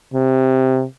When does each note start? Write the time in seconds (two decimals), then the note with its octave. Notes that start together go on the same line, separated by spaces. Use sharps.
0.14 C3